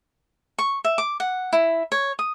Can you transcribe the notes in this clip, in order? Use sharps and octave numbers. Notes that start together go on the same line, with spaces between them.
C#6
E5
D6
F#5
E4
C#5
D#6